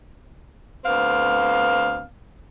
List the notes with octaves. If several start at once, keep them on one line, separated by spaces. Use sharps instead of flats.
D2 B3 C4 F5